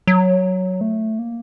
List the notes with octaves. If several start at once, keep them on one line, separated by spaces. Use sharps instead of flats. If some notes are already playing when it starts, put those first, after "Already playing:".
F#3
A3
A#3